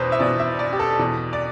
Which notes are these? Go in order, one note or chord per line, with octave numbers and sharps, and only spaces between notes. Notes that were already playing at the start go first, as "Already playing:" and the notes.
Already playing: E2 B2 B4 C5
E5
E2 B2 D5
E5
D5
G4
A4
E2 B2
D5